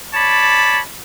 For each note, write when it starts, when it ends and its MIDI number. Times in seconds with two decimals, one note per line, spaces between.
0.14 0.79 73
0.14 0.79 74
0.14 0.79 81
0.14 0.79 83